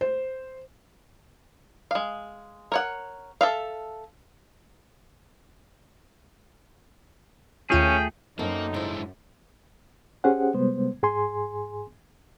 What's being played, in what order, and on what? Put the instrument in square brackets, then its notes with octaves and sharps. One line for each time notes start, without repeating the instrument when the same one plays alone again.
[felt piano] C5
[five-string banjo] G#3 F5
A#4 C#5 F#5
A4 E5 F5
[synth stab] D#2 F4 C#7 [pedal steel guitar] A3 G#4 [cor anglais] C#4 [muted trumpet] G5
[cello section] F#2 [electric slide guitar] A#3 [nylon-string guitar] C4 C#4 A4 [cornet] D#4
[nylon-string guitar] G#2 C5 [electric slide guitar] G#3 D4 E4
[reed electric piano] C#4 G4 G#4 C5 F#5
C3 G3 G#3 B3 C5
G#2 G#4 G#5 C6